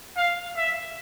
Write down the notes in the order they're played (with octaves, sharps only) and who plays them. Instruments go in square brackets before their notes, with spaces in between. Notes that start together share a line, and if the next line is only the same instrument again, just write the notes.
[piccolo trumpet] F5
E5